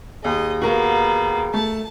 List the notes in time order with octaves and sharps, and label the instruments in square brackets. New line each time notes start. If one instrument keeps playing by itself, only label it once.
[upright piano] D#2 [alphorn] G#4 [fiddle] D#5
[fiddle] A#3 B3 [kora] F#4 A#4
[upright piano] A3 [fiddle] A5